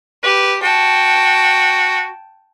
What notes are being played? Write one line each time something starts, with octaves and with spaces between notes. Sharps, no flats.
G4 B4
F#4 G5 A5